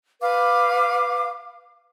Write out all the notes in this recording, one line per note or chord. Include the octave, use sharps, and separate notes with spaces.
B4 F5 D6